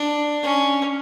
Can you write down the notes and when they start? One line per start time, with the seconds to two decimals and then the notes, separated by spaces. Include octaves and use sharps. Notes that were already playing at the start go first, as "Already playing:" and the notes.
Already playing: D4
0.43 C#4